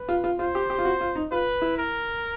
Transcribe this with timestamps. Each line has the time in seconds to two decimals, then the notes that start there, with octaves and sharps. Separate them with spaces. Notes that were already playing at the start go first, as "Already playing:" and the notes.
Already playing: B4
0.09 F4
0.24 F4
0.39 F4 C5
0.55 G4
0.70 G4
0.79 F4
0.85 F#4
1.01 F4
1.15 D#4
1.32 F4 B4
1.62 E4
1.78 A#4